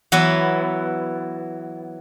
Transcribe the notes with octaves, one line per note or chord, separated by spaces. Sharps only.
E3 F#3 B3 E4 F#4